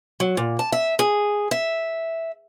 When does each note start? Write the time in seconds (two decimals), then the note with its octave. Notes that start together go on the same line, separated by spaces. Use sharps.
0.20 F#3
0.37 A#2
0.59 A5
0.72 E5
0.99 G#4
1.51 E5